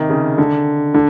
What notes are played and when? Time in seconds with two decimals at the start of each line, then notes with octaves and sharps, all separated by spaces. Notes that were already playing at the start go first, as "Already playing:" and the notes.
Already playing: C3 D#3
0.10 C#3
0.38 D3
0.94 D3